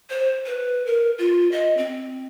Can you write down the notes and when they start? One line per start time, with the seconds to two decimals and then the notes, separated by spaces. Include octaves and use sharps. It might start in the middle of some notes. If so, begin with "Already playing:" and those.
0.10 C5
0.46 B4
0.86 A#4
1.18 F4
1.52 D#5
1.77 C4